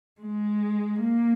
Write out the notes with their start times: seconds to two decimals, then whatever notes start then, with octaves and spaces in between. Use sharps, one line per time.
0.21 G#3
1.00 A#3